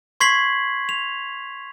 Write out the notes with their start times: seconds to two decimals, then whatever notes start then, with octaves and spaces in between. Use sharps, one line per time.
0.20 C6 C#6 G#6 B6 C7 F#7
0.89 F7